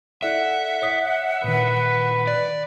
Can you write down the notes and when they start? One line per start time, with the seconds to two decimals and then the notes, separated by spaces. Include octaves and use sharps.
0.23 E4 A4 D5 E5 F#5
0.82 C#5 D#6 B6
1.44 A#2 D#3 B4
2.27 D5